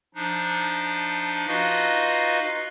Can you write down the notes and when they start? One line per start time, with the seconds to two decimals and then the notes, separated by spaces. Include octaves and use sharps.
0.15 F3 D4 D#4
1.47 D#4 F4 F#4 B4 D#5 F5